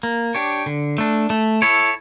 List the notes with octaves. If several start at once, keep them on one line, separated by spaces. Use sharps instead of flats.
A#3
D4 G4 C#5
D3
A3 D4
A3
E4 A4 C#5